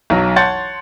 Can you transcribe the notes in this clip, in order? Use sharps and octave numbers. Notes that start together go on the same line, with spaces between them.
B1 F#3
C#5 F#5 A5 C6 G6 A6